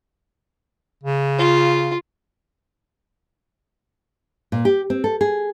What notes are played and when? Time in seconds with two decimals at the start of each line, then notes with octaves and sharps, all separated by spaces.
1.03 C#3
1.39 F4
4.52 A#2
4.65 G4
4.90 C4
5.04 A4
5.21 G#4